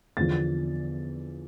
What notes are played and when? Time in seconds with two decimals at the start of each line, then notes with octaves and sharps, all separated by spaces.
0.17 E2 D3 F3 A6